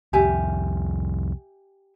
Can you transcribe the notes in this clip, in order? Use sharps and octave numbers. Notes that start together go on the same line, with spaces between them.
C2 F2 G4 E5 G#5